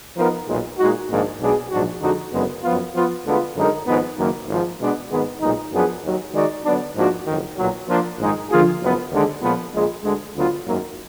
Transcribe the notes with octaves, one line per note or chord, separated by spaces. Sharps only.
F3 B3 D#4 A#4
B1 A#2 G#3
A#2 G#3 D#4 F#4
A#1 G#2 D#3 A#3 D4
B1 B2 G#3 D4 G#4
A#1 G#2 F#3 D4 F#4
F2 D3 G#3 D#4 F#4
F#1 F#2 D3 G#3 B3
F#2 F3 B3 F4
F3 B3 F4
D2 D3 G#3 B3 F4
F#2 D3 G#3 D#4 A#4
G#1 G#2 F3 G#3 B3
F#1 F#2 D#3 A#3
G#1 G#2 F3
B2 G#3 B3 D4
G#1 G#2 D#3 G#3 B3
B1 A#2 G#3 D#4
F#2 F3 B3 D4 G#4
D#2 D#3 F#3
D#3 G#3 D#4 F#4 D5
D3 F#3 B3 D4
G#2 F3 A#3 D4 F#4
F#1 F2 D#3
B1 A#2 F#3
F3 A#3 D4 F4
A#1 G#2 D#3 G#3 D#4
D3 F3 A#3 F4 G#4
F#1 F#2 F3 B3
D#2 D3 G#3 D4
A#2 F3 G#3 B3
A#1 A#2 G#3
D2 D3 G#3
D2 D3 F#3 B3 F4
G#1 F#2 D#3 F#3 A#3